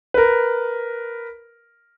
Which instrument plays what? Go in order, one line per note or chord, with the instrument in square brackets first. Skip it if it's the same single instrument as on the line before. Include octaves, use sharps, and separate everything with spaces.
[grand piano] A#4 B4